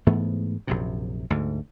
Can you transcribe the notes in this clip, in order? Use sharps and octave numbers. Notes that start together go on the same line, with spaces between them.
G#2 E3 A3 B3
A#1 F#2 C3
D2 G#2